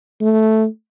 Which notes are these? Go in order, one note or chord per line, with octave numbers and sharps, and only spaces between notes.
A3